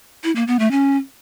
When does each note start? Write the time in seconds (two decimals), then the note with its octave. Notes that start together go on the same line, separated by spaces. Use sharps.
0.24 E4
0.36 A#3
0.47 B3
0.59 A3
0.71 C#4